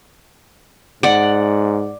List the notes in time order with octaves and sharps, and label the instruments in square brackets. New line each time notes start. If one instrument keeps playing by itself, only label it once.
[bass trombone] G#2 [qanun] D5 F#5